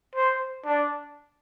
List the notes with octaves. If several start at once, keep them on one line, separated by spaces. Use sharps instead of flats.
C5
D4